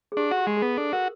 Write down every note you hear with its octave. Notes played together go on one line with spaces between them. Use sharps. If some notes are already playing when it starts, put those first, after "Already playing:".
G#4
D4 G4
F#4
G4
G#3
G#4
B3
D4 A4
F#4 A#4